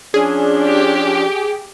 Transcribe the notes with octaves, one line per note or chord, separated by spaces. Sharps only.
F3 C#4 D4 G#4
G4